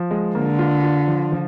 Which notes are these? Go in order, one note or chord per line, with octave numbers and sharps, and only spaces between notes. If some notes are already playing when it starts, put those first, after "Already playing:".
Already playing: F3
G#3
D3 A#3
F4
F4
F3
F3